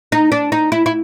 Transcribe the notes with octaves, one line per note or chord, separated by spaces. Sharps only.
D#4
D4
D#4
E4
E4